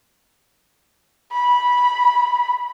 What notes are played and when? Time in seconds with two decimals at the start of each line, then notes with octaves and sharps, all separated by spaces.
1.32 B5